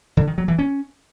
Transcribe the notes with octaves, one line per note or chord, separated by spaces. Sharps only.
D3
D#3
F#3
E3
C#4